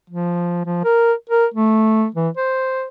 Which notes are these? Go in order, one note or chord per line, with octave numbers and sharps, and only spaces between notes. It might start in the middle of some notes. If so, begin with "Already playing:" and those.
F3
F3
A#4
A#4
A3
E3
C5